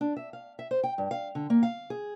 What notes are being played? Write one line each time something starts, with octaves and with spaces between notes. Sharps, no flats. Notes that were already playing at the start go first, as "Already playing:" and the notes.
D4
E5
F5
E5
C5
G5
G2
F5
D3
A#3
F5
G#4